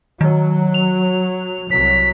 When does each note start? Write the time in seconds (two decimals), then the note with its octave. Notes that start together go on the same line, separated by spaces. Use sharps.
0.21 D#3 F#3
0.74 F7
1.71 C2 F#3 B6